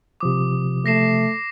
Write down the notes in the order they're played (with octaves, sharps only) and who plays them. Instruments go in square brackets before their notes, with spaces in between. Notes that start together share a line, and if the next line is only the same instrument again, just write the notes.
[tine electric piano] C3 F3 D#6 [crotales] D6
[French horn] A3 [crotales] A#6 C7 E7